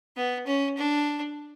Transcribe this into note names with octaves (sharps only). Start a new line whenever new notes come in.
B3
C#4
D4